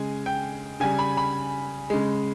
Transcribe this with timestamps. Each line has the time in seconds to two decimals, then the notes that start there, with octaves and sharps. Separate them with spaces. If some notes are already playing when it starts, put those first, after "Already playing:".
Already playing: C#3 G#3 G#5
0.26 G5
0.80 C#3 G3 G#5
0.99 B5
1.17 B5
1.90 C#3 G#3